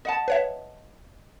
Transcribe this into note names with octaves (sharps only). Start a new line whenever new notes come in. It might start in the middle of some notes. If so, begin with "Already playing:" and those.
D#5 F#5 A5
B4 C#5 E5